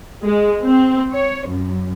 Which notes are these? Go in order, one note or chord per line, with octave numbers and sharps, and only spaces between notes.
G#3
C4
C#5
F#2